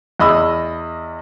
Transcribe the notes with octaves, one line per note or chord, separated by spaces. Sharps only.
E2 D#5 B5 E6